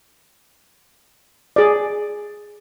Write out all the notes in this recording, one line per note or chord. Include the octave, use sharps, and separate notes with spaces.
G#4 D5